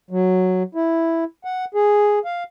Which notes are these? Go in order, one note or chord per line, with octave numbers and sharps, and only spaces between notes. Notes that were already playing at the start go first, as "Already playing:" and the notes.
F#3
E4
F#5
G#4
F5